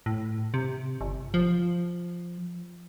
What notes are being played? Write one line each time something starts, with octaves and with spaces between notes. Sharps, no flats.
A2
C3
G1
F3